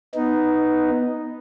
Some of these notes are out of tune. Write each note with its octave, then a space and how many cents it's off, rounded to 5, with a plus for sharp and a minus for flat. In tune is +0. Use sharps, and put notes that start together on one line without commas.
B3 +0 D#4 +0